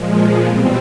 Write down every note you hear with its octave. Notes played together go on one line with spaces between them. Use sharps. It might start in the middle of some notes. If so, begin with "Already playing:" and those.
Already playing: A#2 F3 G#3
E2 B2 G3 C4